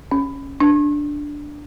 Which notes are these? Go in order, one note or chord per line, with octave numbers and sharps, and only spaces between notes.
C#4
D4